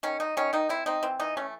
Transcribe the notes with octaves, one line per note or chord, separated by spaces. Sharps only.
D#3 C#4
F#3 D#4
D#3 C#4
D#3 D#4
C4 E4
C4 D#4
E3 C4
E3 D#4
A3 C#4